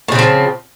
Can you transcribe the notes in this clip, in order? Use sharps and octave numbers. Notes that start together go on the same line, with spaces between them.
A2 C#3 F3 C4